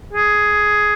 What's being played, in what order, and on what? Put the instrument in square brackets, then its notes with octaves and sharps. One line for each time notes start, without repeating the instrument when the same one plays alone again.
[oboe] G#4